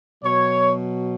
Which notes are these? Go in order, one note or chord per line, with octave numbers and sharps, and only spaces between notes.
B2 F#3 C#5